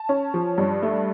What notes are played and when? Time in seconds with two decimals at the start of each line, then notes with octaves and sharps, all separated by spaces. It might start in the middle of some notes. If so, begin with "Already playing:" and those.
Already playing: A5
0.09 C#4
0.34 F3
0.58 G2
0.83 A3